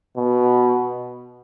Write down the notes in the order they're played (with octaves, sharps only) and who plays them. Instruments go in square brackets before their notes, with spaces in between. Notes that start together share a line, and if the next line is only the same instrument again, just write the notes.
[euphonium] B2